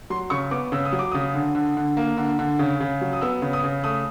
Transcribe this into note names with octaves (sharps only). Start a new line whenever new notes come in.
F#3 C6
C#3 C#6
B3 D6
C#3 E6
D#6
F#3
D6
C#3 D#6
D3
D3
D3
A#3
D3
D3
C#3
C#3
F#3
D#6
B3 E6
C#3
D#6
C#3
A3 D#6